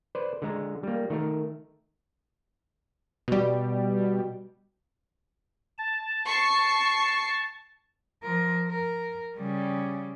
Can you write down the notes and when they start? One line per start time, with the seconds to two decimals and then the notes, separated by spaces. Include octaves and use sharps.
0.15 B4 C5 D5
0.42 D3 G#3 A#5
0.83 G3 A#3
1.10 D#3 A3 A#4
3.28 B2 G3
5.78 A5
6.24 C#6 C7
8.23 F3 A#4
8.68 A#4
9.37 C#3 G3